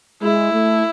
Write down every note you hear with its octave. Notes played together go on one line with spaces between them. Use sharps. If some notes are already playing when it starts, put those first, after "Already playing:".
G#3 E4
A3